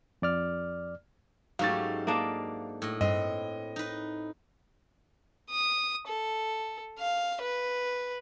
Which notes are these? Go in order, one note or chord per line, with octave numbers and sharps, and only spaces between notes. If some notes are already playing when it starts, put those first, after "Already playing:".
F2 D5 F6
G#2 F#3 A3 C#4 G4 F5 A6
A#3 D4 D#5
A2 D#5
G2 C4 B4 D#5
D#4 B4
D#6
A4
F5
B4